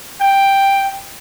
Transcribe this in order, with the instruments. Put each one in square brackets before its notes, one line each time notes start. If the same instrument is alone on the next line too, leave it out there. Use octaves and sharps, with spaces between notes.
[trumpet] G5